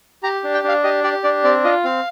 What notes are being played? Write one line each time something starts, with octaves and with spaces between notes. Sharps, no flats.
G4 A#5
D4
G5
D4 F5
G4 D#5
G4 D5
D4 D5
C4 D5
F4 D#5
C4 F5